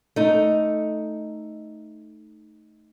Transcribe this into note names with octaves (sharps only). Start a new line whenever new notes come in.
A3 D#4